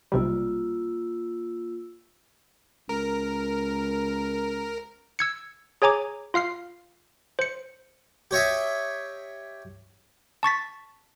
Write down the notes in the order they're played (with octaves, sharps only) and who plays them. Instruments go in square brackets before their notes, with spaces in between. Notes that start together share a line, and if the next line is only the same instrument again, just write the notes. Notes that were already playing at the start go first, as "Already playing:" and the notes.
[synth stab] B1 C3 G3 [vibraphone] A#3 F4 E6
[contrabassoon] C#2 [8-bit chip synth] A#4
[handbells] E6 G#6 C#7
G#4 C#5 G#5 A#5 D6
F4 F5 F6 C7
C5 C#7
[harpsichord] G4 C#5 D#5 E5
[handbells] A5 C#6 A6 B6